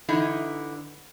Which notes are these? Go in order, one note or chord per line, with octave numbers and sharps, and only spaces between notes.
D3 E3 D#4 E4